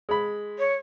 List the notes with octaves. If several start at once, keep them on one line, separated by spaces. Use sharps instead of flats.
G#3 B5
C#5